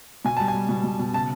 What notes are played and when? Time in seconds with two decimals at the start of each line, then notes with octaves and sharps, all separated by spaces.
0.25 B2 G#5
0.37 G3 A5
0.48 G#5
0.55 G3
0.69 B2
0.84 B2
0.99 B2
1.13 C#3 A5